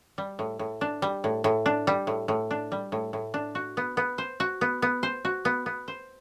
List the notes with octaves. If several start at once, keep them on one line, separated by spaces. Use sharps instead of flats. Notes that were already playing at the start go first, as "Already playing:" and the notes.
G3
A2
A2
D4
G3
A2
A2
D4
G3
A2
A2
D4
G3
A2
A2
D4
F#4
B3
B3
C5
F#4
B3
B3
C5
F#4
B3
B3
C5